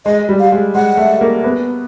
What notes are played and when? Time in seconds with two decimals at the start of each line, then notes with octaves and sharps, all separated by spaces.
0.05 G#3 D#5
0.29 G3
0.40 F5
0.52 G#3
0.75 G#3 F#5
0.97 A3
1.21 A#3
1.44 B3